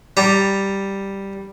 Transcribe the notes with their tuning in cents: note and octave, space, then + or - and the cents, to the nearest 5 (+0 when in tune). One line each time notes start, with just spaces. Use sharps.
G3 +0 A#5 -25